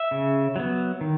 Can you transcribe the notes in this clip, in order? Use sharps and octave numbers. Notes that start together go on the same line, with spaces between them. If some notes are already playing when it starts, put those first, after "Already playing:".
Already playing: E5
C#3
F#3 B3
D#3